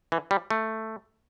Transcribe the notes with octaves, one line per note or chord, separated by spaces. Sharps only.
E3
G3
A3